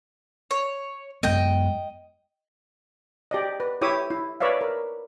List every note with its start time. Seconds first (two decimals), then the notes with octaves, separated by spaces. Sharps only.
0.51 C#5
1.23 F#2 G#3 B3 D#5 G5
3.31 G4 D5 D#5
3.60 B4
3.81 E4 G4 C#5 E5 D6 D#6
4.10 E4
4.40 B4 C#5 D5 E5 F5
4.61 A#4